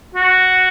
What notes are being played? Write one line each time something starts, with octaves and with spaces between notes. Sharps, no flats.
F#4